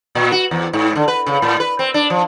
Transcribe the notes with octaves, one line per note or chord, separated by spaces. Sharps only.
A#2
F#4
E2
G#2
D3
B4
C#3
A2
B4
C4
D4
F3